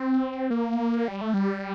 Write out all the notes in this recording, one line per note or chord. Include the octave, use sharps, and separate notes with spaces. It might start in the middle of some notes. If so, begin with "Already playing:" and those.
Already playing: C4
A#3
G3
A3
G3